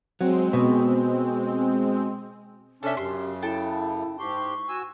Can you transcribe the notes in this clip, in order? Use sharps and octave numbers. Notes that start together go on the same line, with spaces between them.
F#3 G#3 C4
B2
C3 C#4 D4 A4 E5
F#2 C#3 G4 C6
E4 A4 G5 A5
G#2 G4 C6 C#6
F#4 G#5 E6